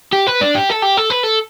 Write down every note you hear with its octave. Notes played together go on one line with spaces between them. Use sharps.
G4
B4
D4
G4
A4
G4
A4
B4
A4